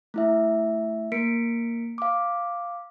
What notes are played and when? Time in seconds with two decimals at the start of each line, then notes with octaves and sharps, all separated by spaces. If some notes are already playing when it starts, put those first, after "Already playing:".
0.14 A3 E4 E5
1.12 A#3 A#4 B6 C#7 D7
1.98 F5 D6